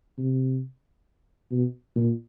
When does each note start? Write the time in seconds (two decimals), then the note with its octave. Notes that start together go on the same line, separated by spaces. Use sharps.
0.18 C3
1.51 B2
1.96 A#2